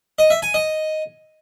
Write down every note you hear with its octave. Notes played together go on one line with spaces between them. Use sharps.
D#5
E5
G#5
D#5